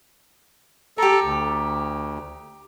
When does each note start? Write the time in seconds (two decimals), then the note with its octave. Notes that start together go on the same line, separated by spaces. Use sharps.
0.98 G4 A4 A#4
1.23 D2